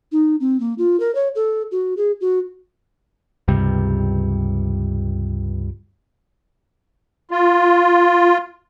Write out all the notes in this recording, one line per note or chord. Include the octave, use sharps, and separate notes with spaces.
D#4
C4
A#3
F4
A#4
C#5
A4
F#4
G#4
F#4
C#2 G2 C3 G3
F4